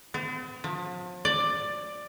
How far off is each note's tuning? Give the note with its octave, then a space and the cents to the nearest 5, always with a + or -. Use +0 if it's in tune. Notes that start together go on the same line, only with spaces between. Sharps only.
C4 -45
F3 +40
D5 +10